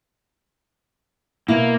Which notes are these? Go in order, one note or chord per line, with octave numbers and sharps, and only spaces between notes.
B2 A#3 E4